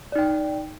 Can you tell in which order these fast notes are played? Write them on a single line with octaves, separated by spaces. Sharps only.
D5 D#4 G5